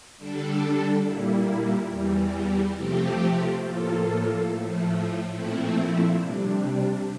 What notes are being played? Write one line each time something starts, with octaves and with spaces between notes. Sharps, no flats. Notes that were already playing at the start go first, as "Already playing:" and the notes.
D3 G3 D4 A4
A#2 G3 A#3 E4
E2 E3 G3
C3 F3 A3 C4 G4
A2 F3 A#3 F4 A4
A2 F3 A3
A#2 F3 A3 C4 E4
C3 G3 D4